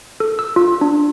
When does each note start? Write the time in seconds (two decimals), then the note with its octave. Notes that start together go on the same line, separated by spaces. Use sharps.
0.20 A4
0.39 E6
0.56 F4
0.81 D4